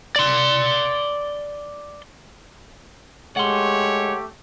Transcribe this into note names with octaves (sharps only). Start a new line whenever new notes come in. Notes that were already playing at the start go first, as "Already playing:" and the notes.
D5 C6
G#3 A3 G4 C#5 F#5 C6